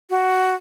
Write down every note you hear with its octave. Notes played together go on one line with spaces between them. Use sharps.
F#4